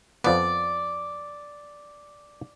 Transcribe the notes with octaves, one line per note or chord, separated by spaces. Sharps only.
F2 F3 B3 D5